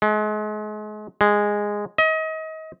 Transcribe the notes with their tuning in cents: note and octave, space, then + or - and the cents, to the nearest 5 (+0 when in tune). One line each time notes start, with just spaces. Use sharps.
G#3 +35
G#3 -10
D#5 +30